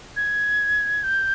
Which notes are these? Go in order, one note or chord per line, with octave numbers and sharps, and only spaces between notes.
G#6
G6